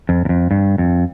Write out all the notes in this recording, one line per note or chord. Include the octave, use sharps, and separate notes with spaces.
F2
E2
F2
G2
F2